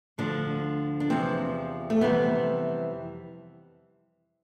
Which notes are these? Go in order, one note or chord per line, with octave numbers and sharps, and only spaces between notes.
D2 D3 F3 D4
D4
E2 C3 F3 C4
A3
F2 C3 E3 G3 B3